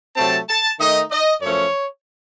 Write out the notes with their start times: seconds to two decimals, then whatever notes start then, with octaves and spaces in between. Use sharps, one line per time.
0.16 C3 F#3 A3 C4 A5
0.48 A5
0.79 D#3 A3 D#4 D#5
1.11 D#5
1.42 F#2 F3 A3 C#4 C#5